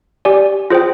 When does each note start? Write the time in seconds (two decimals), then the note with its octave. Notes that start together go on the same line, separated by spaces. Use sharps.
0.25 G4 D5 G#5
0.70 F4 G#4 C5 G5